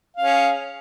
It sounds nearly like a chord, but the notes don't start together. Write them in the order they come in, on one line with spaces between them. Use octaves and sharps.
F5 C#4 G#4